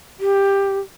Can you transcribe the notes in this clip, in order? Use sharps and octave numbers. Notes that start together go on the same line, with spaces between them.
G4